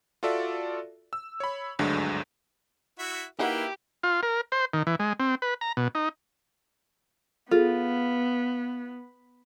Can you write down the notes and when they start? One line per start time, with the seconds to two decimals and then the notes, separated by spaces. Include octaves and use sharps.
0.23 F4 F#4 A4 D5 E5
1.13 E6
1.40 C#5 B5
1.79 G#1 D2 G2 D3 F#3 G#3
2.99 E4 F#4 E5
3.39 A#3 D#4 E4 F#4 G4 B4 F#5
4.03 F4
4.23 A#4
4.52 C5
4.74 D#3
4.87 E3
5.00 G#3
5.20 C4
5.42 B4
5.61 A#5
5.77 B2
5.95 D#4
7.51 B3 F4 G#4 A4